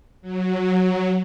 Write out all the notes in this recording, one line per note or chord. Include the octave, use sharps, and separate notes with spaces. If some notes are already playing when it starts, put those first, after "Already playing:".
F#3